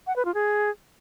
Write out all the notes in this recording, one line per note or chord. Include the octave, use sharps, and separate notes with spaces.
F#5
B4
F4
G#4